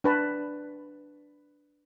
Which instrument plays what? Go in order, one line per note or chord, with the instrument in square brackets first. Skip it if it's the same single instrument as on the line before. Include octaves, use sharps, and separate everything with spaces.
[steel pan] D4 B4 A5